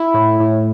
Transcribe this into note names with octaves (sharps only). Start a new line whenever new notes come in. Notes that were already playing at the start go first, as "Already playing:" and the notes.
Already playing: E4
A2
A2